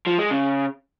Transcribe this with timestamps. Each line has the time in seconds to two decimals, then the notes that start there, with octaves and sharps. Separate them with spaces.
0.07 F3
0.18 G#3
0.30 C#3